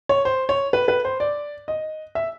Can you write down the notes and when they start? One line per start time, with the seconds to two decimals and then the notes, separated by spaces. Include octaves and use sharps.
0.09 C#5
0.25 C5
0.49 C#5
0.73 B4
0.88 B4
1.05 C5
1.20 D5
1.68 D#5
2.15 E5